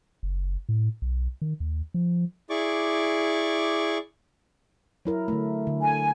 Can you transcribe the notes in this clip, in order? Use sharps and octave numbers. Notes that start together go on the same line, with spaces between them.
F#1
A2
B1
D#3
D#2
F3
E4 G#4 D5 C#6 D6
F#3 E4 A#4
D3 A3
D3
G#5